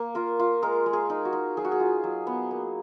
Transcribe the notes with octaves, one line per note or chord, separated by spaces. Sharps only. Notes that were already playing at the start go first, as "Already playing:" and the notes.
Already playing: A#3
F4 A#4
F4
G#3 A#4
G#3
G#4
D#4
F#4
D#4
F#3 G#4
F#4
G#4
F4
F#3
B3
A#3